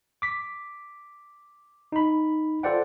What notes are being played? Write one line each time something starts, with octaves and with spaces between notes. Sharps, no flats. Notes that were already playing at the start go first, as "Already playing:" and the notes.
D6 B6
D#4 B5
F4 A4 C5 D5 F#5 G5